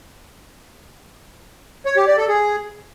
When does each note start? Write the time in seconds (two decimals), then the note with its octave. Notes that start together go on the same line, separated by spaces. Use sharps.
1.86 C#5
1.96 G4
2.07 D5
2.18 A4
2.28 G#4